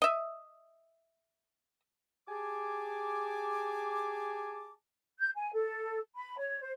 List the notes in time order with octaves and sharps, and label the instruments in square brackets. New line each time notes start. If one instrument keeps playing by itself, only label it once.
[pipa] D#5 E5
[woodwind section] G4 G#4 G#5 A5 D6
[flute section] G6
G#5
A4
B5
C#5
C5